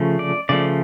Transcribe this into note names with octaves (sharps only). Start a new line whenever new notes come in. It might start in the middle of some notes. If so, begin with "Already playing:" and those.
Already playing: C#3 F3 A3
D5
C#3 F3 A3 D5